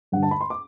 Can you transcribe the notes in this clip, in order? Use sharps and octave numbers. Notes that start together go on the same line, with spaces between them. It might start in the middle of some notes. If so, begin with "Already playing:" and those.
G2 D3 F#5
A5
B5
C6
D6